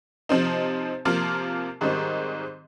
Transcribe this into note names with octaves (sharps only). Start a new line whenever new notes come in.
C3 F3 C4 D#4
C3 F3 A#3 F4
G#2 D#3 G3 C4 D#4